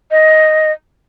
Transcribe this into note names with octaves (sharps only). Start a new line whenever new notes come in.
D#5